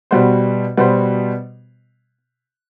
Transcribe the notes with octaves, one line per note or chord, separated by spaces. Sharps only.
B2 G3 B3 F#4 C5
B2 G3 B3 F#4 C5